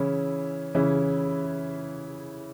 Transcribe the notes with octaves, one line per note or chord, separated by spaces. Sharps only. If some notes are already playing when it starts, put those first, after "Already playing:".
Already playing: C#3 E3 C#4 E4
C#3 E3 C#4 E4